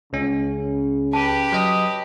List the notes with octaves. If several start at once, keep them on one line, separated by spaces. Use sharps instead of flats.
C#2 C#3 C#4
G4 B4 A5
F#3 D#5 D#6